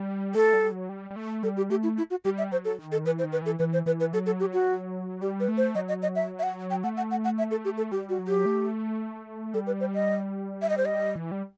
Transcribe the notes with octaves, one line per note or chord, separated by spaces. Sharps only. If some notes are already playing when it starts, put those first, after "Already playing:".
Already playing: G3
A3 A4
G3
F#3
G3
G3
A3
G3 A4
G4
A3 G4
E4
E4
F#4
G3 G4
E5
F#3 C5
A4
D#3
A4
E3 B4
C5
D#3
B4
E3 A4
E3 B4
C5
E3 B4
B4
F#3 A4
A4
G4
F#4
G3 G4
B4
A3
C5
F#3 D#5
D#5
D#5
E5
E5
F#5
G5
A3 F#5
F#5
F#5
F#5
E5
A4
G4
A4
G3 G4
F#4
F#3
G4
A3
G3 A4
B4
C5
D#5
E5
D#5
C5
D#5
E3
G3